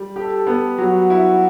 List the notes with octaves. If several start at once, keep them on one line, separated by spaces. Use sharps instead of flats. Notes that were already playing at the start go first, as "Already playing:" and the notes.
Already playing: G3
G4 A4
B3
F#3 F#4
E4